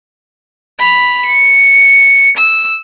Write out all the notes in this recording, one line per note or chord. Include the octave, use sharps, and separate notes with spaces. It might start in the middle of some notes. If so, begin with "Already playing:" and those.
B5 F7
C#7
E6